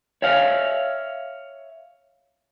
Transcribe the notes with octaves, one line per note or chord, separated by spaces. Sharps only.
C#5 E5 F5